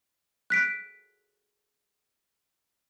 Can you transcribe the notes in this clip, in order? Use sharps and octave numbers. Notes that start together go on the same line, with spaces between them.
F#6 B6 D7